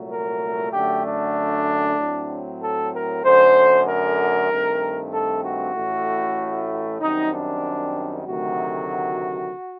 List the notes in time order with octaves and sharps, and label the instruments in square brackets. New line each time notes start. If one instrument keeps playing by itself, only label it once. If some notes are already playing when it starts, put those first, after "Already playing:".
Already playing: [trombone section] C2 A#2 F#3 A3
A#4
F#2 D3 A3 G4
D4
A2 F#3 C4
A4
A#4
F#2 D3 A3 C5
A#4
G2 D#3 A3 C4
A4
F#4
A1 A2 A3
F#2 D#3 G3 C4 D#4
D4
D2 C3 D#3 F#3 A3 F#4